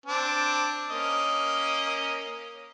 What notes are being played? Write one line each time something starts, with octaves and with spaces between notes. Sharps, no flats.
C4 D4
A#3 C#4 D#5